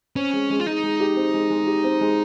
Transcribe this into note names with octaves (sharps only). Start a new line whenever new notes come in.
C4 C#4
G#3
G#3
F4
G#3 D#4
G#3
G4
C4
G#3
G#3
G4
C4
G#3